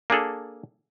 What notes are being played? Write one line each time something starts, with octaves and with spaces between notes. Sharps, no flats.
A#3 D4 G#4 A4